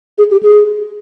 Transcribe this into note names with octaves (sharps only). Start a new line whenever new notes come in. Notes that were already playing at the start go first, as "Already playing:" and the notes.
G#4
G4
G#4